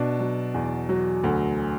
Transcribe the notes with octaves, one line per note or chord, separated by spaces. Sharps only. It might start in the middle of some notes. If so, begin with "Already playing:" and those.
Already playing: B2 D4
F#3
E2
F#3
D2